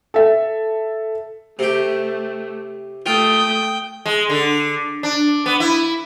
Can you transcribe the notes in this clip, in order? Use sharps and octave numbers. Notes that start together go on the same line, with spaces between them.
A4 E5
C3 A3 G4
A3 F4 G5 D#6
G#3
D3
D4
B3
E4